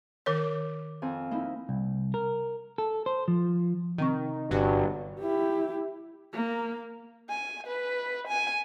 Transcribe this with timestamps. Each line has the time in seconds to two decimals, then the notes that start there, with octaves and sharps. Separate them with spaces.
0.26 D#3 A#4 C#5 D6
1.02 F2 C4 G#5
1.31 A#3 D#4 E4
1.69 C2
2.14 A#4
2.78 A4
3.06 C5
3.28 F3
3.98 C3 D#3 C4 C#6
4.51 G1 G2 F#3
5.20 E4 G4
6.33 A#3
7.30 G#5
7.67 B4
8.28 G#5